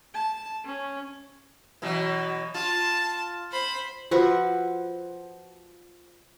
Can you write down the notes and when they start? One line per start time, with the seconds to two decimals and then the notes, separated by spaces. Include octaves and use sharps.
0.14 A5
0.65 C#4
1.82 B2 E3 F#3
2.55 F4 A5
3.51 C5 B5
4.11 F3 F#4 B4 E5